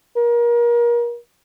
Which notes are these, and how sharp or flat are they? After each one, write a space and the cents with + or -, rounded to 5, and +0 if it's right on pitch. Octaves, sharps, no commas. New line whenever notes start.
A#4 +30